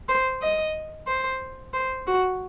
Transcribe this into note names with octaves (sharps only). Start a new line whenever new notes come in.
C5
D#5
C5
C5
F#4